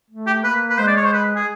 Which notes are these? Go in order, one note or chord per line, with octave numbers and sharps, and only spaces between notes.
A3
G4
A#3 B4
B4
G#3 C5
D5
C#5
C5
B4
G#4